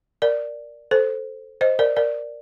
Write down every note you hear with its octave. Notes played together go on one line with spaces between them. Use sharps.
A#4 D5
A4 C5
C5 D#5
A#4 D5
A#4 D5